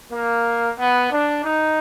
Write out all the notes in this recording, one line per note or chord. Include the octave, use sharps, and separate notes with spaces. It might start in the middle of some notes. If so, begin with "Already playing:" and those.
A#3
B3
D4
D#4